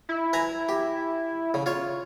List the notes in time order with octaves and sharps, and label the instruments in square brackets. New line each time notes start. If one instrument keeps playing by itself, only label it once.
[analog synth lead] E4
[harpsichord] B4 G#5 A#5
G4
C#3
F4 C#5